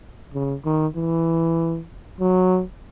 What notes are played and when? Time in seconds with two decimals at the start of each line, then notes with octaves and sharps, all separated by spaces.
0.34 C#3
0.65 D#3
0.95 E3
2.20 F#3